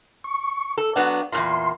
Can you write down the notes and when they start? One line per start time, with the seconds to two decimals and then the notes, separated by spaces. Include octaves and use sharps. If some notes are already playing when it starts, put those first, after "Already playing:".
0.24 C#6
0.78 A4
0.96 F#3 B3 D4 F#5
1.32 E2 G2 A#2 C6